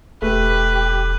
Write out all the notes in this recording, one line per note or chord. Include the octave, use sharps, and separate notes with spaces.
E1 A3 G4 B4